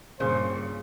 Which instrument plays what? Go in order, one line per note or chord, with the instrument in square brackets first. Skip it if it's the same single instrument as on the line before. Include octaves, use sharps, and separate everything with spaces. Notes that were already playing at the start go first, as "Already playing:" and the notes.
[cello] G2 [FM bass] A#2 [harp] C#3 [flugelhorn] C5